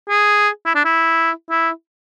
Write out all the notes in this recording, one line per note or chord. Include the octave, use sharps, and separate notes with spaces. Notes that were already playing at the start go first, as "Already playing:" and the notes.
G#4
E4
D4
E4
E4